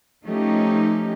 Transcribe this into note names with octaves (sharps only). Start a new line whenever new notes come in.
F3 A3 C#4 D#4 G4